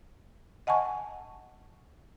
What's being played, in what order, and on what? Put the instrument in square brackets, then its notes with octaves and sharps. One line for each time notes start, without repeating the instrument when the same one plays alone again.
[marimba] D#5 F#5 G#5 A5 C#6